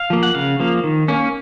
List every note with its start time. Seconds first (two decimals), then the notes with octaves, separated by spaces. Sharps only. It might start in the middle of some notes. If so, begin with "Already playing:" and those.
Already playing: F5
0.10 F3 A#3
0.23 F#5
0.35 C#3 F5
0.60 F3 A#3
0.84 D#3
1.08 A#3 C#4